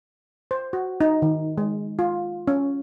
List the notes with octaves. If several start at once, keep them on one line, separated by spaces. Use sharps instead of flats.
C5
F#4
D#4
D#3
G#3
F4
C#4